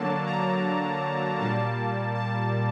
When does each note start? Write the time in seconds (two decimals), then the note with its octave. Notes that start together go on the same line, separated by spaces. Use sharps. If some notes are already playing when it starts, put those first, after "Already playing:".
Already playing: D3 F#3 A#3 A5
0.26 A#5
1.39 A#2 G3 A#3 A5
2.15 A5